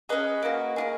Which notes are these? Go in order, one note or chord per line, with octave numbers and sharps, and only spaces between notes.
C#4 G#4 B4 D#5
A#3 D#4 F#4
A#3 F4 G#4